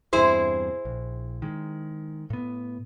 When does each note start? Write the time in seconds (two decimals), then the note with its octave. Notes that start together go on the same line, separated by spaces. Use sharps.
0.13 E2 G2 C3 E4 G#4 C5
0.85 A#1
1.42 D#3 G#3
2.30 A2 B3